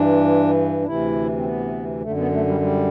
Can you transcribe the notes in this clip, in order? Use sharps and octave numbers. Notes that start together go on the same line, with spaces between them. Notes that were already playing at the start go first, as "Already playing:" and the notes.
Already playing: G2 E3 D4
D4
D2 C3 E3 E4
C4
B3
F#2 D3 A3
B3
A3
G3
G3